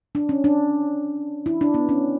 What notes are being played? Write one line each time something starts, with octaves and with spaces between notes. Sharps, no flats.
D4
C#4
D4
E4
D4
B3
C#4